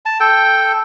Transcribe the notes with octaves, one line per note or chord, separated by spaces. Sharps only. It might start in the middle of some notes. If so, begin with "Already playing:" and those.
A5
A4 G5